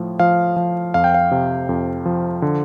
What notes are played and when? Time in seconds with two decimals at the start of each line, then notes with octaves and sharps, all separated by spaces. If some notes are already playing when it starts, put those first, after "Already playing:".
Already playing: A2 F3
0.19 F3 F5
0.56 F3
0.94 F2 F5
1.04 G5
1.14 F5
1.31 C3
1.69 F2
2.06 F3
2.42 D3